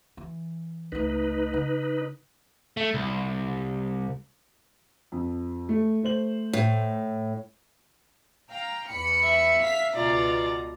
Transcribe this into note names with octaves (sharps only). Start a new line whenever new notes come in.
E3
C#2 A3 D#4 B4
C#3
A3
C2
F2
A3
A3 C5 F#7
A2
F5 G5 A#5
E2 B5 C#7
E5
F5 B6 C7
C#2 B2 F4 D5 A#5